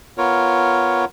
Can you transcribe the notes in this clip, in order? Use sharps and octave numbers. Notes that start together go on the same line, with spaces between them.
B3 F4 A#4 C#5